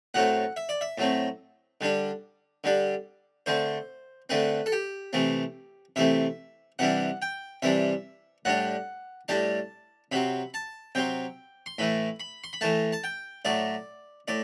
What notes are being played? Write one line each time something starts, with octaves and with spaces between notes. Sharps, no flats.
A2 F#3 A3 C4 F#5
E5
D5
E5
A2 F#3 A3 C4
D3 G3 D4
D3 G3 D4
D3 A3 C4 C5
D3 A3 C4 B4
A4
G4
C3 E3 A3 C4
C3 E3 A3 C4 E5
C3 E3 G3 D4 F#5
G5
C3 E3 G3 D4 E5
A2 G3 D4 F#5
A2 G3 D4 A5
C3 F#3 C4 B5
A5
C3 F#3 C4 G5
C6
A2 E3 A3 B5
B5
C6
B5
A2 E3 A3 A5
A5
G5
A2 F#3 A3 D5
A2 D5